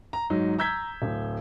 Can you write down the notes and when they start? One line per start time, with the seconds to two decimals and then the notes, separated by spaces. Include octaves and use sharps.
0.13 A#5
0.30 G#2 F#3 D#4
0.59 A#5 E6 G6 G#6 B6
1.02 D1